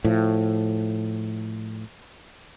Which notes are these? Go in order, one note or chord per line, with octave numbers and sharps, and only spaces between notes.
A2 F3